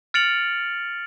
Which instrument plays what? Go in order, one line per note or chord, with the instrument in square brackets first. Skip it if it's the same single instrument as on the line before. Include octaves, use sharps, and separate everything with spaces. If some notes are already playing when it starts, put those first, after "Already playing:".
[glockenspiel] F6 A6 C#7 D7 F7 F#7